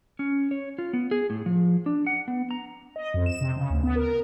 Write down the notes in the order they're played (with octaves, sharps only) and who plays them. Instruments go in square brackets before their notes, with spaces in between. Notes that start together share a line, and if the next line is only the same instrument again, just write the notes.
[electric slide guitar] C#4
C#5
F4
B3
G#4
A2
F3
D4
F#5
B3
A#5
[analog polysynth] D#5
F2
E7
C3
C#3
D2
B3
A#4
A#4